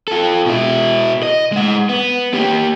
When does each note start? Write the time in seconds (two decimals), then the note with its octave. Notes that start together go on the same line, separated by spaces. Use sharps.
0.08 F4 A4
0.46 B2 E4
1.23 D#5
1.52 G#3 F#5
1.89 B3
2.34 A#3 G4